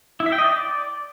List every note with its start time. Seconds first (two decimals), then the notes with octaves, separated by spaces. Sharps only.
0.20 E4
0.26 E5
0.32 G5
0.38 D#5
0.45 D5